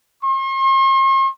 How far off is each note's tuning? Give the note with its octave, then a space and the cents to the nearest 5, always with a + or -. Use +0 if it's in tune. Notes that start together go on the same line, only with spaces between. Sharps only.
C6 +45